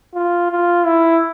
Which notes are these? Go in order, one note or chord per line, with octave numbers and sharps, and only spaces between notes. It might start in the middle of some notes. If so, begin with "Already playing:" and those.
F4
F4
E4